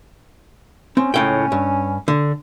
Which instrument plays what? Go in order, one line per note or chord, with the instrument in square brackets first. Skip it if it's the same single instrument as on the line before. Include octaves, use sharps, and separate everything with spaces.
[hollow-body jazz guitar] C4 [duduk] C#4
[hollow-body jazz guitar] C#2 A2 G5 [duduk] C#4
[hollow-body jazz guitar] G2
D3